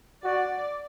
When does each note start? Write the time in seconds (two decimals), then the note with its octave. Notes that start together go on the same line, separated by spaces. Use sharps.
0.23 F#4 D5